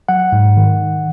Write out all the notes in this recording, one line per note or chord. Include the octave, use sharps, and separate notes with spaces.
F#3 F#5
G#2
D#3